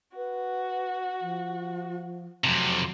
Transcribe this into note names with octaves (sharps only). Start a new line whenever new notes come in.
F#4 B4
F3
F2 C3 F#3